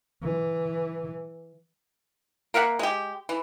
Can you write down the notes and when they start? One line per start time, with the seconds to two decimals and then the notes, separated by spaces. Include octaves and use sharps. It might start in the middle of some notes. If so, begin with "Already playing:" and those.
0.23 E3
2.54 A#3 A#4 E5 F#5
2.79 G#3 G4
3.29 E3